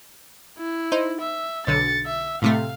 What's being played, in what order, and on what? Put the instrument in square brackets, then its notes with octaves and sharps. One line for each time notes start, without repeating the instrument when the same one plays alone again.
[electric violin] E4
[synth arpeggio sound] D#4 C5
[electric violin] E5
[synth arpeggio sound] B1 D3 [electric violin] A6 C#7
[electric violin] E5
[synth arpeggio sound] A2 C3 A3 [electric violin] F5